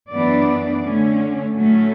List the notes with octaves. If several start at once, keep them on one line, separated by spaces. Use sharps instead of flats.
F#2 E3 B3 D4 D5
D3 A3 C#4
A2 F#3 A3 C#4